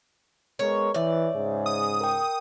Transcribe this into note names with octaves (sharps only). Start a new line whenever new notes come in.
G#3 B3 A#4 C#5
E3 C#5 D5 E5
G#2 C#3 G#4
D#6
A#4 G5